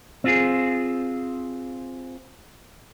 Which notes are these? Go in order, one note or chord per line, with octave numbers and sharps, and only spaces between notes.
C4 F4 G#4